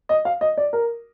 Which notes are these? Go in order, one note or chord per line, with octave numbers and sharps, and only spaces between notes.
D#5
F5
D#5
D5
A#4